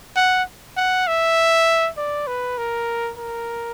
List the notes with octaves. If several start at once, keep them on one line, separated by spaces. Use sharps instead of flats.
F#5
F#5
E5
D5
B4
A#4
A#4